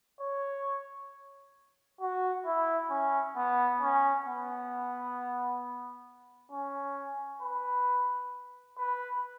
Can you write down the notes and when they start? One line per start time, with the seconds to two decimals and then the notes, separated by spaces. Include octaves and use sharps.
0.21 C#5
2.01 F#4
2.46 E4
2.90 C#4
3.36 B3
3.81 C#4
4.26 B3
6.52 C#4
7.42 B4
8.78 B4